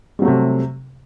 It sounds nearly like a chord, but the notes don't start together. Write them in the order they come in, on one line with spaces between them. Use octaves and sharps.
G3 F#3 A3 C3